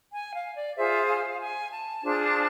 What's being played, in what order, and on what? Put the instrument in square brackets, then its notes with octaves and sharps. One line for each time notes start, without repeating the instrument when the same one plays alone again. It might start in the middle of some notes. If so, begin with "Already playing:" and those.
[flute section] G#5
F5
D5
F4 G#4 C5 E5
F5
G#5
A5
D4 F4 G#4 C5